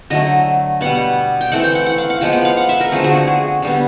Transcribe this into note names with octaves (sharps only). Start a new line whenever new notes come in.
D3 F#3 A3 D#5
B2 G3 B3 F#5
G5
E3 A3 C4 F#5
G5
F#5
F#5
F5
F#5
F3 G#3 B3 G5
F#5
F5
F#5
E5
A#4
D3 F3 A3 C4 G#4
F#4
F#4
G#4
D3 G3 B3